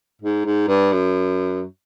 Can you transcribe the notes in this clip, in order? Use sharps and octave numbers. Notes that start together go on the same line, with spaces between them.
G#2
G#2
G2
F#2